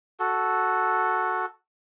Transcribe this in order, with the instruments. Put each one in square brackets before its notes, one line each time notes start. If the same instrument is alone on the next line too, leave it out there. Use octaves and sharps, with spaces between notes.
[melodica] F#4 A4